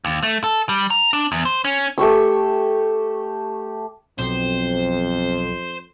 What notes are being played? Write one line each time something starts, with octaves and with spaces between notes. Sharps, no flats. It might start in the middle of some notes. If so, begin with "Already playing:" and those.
D#2
A3
A4
G3
A#5
D4
E2
C5
C#4
A3 G4 C#6 E6
B1 F2 C4 C5